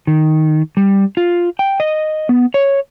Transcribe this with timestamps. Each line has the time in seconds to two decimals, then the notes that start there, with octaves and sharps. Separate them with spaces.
0.07 D#3
0.77 G3
1.17 F4
1.59 G5
1.80 D#5
2.29 B3
2.54 C#5